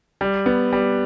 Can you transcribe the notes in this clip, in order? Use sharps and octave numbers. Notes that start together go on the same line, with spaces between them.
G3
B3
G3